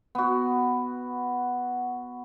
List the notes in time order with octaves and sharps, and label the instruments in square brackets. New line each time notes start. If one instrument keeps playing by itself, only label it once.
[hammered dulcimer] B3 F#4